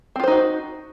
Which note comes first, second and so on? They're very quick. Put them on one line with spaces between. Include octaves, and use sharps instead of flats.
C4 F4 C5 D#4 F#4